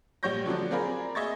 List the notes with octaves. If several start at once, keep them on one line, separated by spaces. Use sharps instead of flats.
A#1 G3 C#5 C#6 G6 A#6
D3 F3 F#3 D4
C4 F4 G#4 A#4 D5 B5
G#4 D#5 E5 C#6 G#6 A6